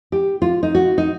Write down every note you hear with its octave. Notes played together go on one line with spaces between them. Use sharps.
G4
F4
D#4
F#4
D#4